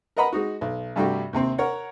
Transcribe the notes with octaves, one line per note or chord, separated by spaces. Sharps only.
A#4 B4 D#5 F#5 A#5 B5
G#3 D#4 F#4
B1
G2 C3 G3 A3 F#4 G4
D#2 C3 C4
A#4 C#5 F#5